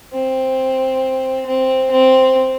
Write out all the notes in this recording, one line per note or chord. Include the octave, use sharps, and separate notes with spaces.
C4
C4
C4